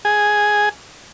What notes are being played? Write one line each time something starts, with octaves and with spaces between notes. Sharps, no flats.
G#4